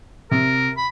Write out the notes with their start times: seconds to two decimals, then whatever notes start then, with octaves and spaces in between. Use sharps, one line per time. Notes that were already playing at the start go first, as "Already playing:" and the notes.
0.31 C3 A#4
0.77 B5